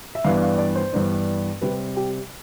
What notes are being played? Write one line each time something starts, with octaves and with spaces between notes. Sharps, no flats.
E5
G2 E3 B3 D4 F5
F5
D5
C5
G2 E3 B3 D4
C3 G3 C4 B4
G4